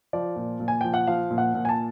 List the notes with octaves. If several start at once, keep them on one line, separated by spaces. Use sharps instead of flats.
F3 D5
A#2
A#2
G#5
F3 G5
F#5
F3 F5
A#2
F#5
A#2
G#5
A5